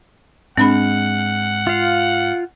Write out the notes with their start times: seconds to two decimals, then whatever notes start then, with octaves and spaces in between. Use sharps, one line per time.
0.57 G#2 G#3 C4 D4 F#5 B5
1.67 F4 F5